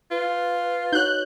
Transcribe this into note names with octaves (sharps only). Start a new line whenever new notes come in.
F4 B4
D#4 F#4 C#5 F#6 G6